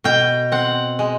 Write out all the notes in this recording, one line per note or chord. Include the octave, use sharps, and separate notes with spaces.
B2 G5
C4 F#5
G#3